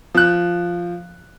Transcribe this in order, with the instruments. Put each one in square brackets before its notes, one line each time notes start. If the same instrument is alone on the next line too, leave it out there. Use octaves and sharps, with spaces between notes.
[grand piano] F3 F#6